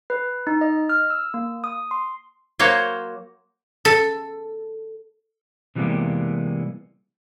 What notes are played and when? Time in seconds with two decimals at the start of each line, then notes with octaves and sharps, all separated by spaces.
0.10 B4
0.47 D#4
0.61 D#5
0.89 F6
1.10 E6
1.34 A#3
1.64 D#6
1.91 C6
2.59 F#3 A#3 C5 C#5
3.85 A4
5.75 C3 E3 G3 G#3 A#3 B3